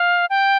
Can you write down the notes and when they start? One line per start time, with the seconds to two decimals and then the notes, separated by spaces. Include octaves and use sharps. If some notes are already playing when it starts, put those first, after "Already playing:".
Already playing: F5
0.30 G5